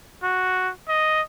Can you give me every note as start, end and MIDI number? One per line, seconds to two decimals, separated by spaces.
0.23 0.71 66
0.88 1.21 75